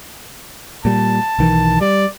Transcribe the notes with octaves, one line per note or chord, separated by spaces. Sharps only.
A#2 G3 A5
B1 D#3 E3
G3 D5